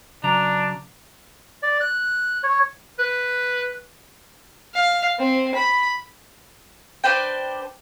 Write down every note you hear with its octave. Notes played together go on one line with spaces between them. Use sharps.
C#3 F#3 D4 A#5
D5
F#6
C#5
B4
F5
C4
B5
D4 B4 C5 G5